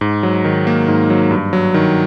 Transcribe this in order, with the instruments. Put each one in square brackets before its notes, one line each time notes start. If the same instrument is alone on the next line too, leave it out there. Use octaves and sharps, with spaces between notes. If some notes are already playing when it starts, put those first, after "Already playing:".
[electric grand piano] G#2
F#3
D#3
A#3
G#2
F#3
G2
F#3
D#3